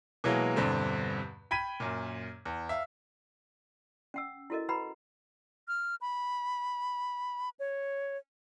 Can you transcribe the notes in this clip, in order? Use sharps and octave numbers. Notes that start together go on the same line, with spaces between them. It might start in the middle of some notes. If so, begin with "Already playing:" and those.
B2 E3 F#3 G#3 A#3
E2 G2 B2 D3 G3 C4
G5 B5 G#6 B6 D#7
F#2 A#2
E2
E5 F5
C#4 F#5 E6
E4 F#4 A4 A#4 D#5
F#4 B4 F#5 A#5 B5
F6
B5
C#5